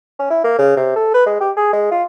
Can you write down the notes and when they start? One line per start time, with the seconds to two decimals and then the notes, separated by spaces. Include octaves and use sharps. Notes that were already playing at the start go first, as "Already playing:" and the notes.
0.19 C#4
0.30 E4
0.44 A#3
0.59 C#3
0.77 C3
0.96 A4
1.14 B4
1.26 G#3
1.41 G4
1.57 G#4
1.73 G#3
1.91 F4